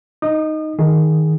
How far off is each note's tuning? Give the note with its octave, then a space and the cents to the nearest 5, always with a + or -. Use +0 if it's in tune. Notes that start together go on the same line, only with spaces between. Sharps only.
D#4 +0 D#6 -35
D#3 +10 G#4 +0